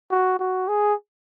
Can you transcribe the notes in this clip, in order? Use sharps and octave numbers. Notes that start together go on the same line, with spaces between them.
F#4
F#4
G#4